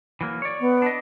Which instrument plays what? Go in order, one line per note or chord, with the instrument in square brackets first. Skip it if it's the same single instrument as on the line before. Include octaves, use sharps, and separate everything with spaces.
[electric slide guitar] E3 F#3 A#3
C#5 D5
[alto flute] B3
[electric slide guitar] D4 D#5